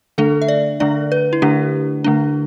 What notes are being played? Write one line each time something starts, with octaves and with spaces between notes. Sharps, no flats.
D3 A3 D4 A4
E5
D5
D3 A3 D4 D5
B4
E4
D3 A3 D4 G4
D3 A3 D4